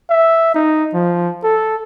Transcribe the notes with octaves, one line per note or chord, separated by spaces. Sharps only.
E5
D#4
F3
A4